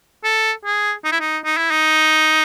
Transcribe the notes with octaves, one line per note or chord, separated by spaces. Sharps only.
A4
G#4
D#4
E4
D#4
D#4
E4
D#4